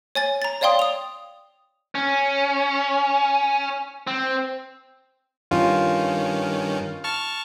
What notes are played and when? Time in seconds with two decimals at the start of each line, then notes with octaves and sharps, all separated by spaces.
0.15 C#5 G#5 A6
0.42 A#5 A6
0.61 C#5 D5 F5 G5 C6 D#6
0.79 D#6 F7
1.95 C#4
4.07 C4
5.51 G2 D#3 C#4 F4
7.04 A5 C#6 F6